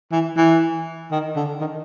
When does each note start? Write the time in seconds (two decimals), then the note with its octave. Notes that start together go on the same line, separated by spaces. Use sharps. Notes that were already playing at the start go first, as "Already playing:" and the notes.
0.12 E3
0.37 E3
1.11 D#3
1.36 D3
1.61 D#3